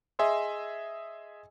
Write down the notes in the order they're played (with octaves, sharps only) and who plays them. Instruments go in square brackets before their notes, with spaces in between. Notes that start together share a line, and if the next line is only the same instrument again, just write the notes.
[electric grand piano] G#4 D#5 E5 G#5 C6 E6